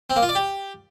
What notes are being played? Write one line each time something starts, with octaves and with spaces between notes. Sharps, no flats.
C4
A#3
F4
D5
G4